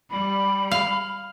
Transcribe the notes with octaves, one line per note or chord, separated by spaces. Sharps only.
G3 B5
F5